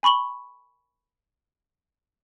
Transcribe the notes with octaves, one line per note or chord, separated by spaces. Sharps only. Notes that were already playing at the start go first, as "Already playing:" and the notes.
G#5 B5 C#6 F#7 G7